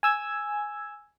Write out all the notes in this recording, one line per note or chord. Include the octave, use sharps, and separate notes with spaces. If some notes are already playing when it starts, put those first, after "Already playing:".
G#5 E6 G#6